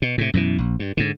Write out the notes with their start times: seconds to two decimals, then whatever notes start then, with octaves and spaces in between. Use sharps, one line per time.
0.02 B2
0.18 A2 C3
0.34 F#2 B2 D#3 E3
0.58 A#1
0.79 G2
0.97 G#2 D3